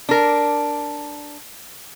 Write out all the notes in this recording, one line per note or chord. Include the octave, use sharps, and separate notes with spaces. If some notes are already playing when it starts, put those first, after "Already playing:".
D4 A#4